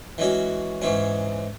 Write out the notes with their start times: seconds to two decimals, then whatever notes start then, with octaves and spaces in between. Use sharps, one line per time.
0.18 E3 G#3 C#4 F#4
0.82 G#2 E3 G#3 C#4